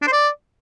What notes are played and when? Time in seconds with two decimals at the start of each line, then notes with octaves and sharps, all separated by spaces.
0.02 D4
0.07 C5
0.12 D5